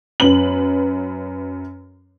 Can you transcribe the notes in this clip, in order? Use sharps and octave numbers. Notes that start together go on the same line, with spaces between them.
F#2 B4 F#7